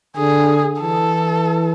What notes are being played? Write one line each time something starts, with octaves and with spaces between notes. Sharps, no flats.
D3 G#4
E3 A4